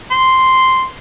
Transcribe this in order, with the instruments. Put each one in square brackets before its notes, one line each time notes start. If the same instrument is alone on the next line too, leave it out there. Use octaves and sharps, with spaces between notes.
[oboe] C6